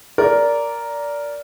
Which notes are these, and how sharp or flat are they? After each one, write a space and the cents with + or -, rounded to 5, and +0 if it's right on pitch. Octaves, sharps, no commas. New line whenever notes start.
A#4 +0 D5 -15